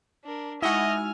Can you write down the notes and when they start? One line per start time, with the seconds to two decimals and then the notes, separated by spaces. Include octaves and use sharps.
0.24 D4 A#4
0.62 G#3 D#4 E4 F#4 D#5 G#5 E6 F6